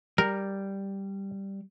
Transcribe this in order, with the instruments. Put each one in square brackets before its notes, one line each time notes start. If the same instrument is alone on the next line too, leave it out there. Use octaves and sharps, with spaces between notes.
[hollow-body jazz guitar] G3 [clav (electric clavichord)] A#4